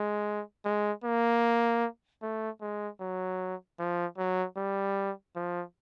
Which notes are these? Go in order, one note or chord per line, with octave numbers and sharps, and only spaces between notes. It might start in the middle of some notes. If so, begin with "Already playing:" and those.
Already playing: G#3
G#3
A#3
A3
G#3
F#3
F3
F#3
G3
F3